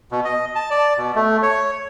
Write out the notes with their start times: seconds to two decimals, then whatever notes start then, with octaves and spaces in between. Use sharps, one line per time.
0.12 B2
0.25 D#5
0.55 A5
0.71 D5
0.98 B2
1.15 A3
1.43 C#5